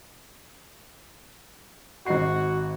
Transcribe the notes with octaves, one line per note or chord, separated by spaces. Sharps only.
G#1 F#4 D#5 C7